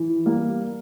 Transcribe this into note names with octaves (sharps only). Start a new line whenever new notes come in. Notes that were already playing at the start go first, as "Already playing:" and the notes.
Already playing: E3
G3 A#3